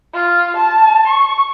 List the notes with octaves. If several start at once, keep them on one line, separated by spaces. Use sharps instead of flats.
F4
A5
C#6